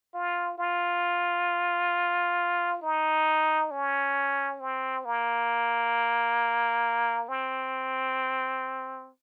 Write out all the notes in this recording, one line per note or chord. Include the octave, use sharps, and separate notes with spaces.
F4
F4
D#4
C#4
C4
A#3
C4